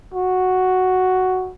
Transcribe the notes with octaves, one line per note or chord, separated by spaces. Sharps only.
F#4